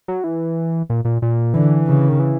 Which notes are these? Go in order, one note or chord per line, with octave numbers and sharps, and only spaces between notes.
F#3
E3
A#2
A#2
A#2
D3 E3
C#3
D#3
E3